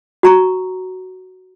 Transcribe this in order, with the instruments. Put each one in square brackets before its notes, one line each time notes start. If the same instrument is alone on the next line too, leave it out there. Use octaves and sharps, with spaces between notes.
[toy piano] F#4 A#5 C#6